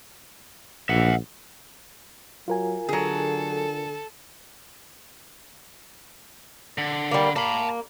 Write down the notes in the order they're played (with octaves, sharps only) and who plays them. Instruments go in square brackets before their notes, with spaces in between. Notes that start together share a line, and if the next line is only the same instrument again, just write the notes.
[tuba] A#1 [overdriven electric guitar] E5 F#5
[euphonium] F#3 [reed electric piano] F4 A#4 G#5
[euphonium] D3 [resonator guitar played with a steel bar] F#3 G#4 [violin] A4
[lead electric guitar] D3
[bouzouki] G3 A#3
[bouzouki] A#3 [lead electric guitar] A5 B5